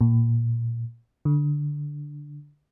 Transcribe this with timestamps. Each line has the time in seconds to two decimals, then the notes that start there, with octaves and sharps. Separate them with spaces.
0.01 A#2
1.25 D3